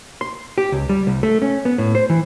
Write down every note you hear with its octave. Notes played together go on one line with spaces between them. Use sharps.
C6
G4
C#2
G3
C2
A3
C#4
B3
A2
C5
E3